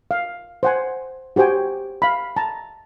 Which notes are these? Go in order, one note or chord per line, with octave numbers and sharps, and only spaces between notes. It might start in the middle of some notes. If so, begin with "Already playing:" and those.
F5
C5 F#5 G#5
F#4 G4 C5 G5 G#5
F5 B5
A5 A#5